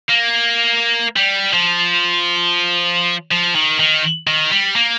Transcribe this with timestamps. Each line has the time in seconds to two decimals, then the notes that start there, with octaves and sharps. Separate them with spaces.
0.09 A#3
1.16 G3
1.53 F3
3.32 F3
3.56 D#3
3.80 D#3
4.27 D#3
4.51 G3
4.76 A#3